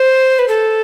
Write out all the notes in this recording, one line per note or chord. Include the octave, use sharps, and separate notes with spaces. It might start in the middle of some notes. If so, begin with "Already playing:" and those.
Already playing: C5
B4
A4